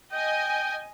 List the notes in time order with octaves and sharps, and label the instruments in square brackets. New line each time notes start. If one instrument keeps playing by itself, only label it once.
[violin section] D#5 G#5 [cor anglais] G5